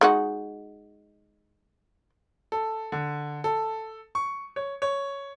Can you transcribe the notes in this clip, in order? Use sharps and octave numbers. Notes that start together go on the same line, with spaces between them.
G#3 D#4 F#4
A4
D3
A4
C#6
C#5
C#5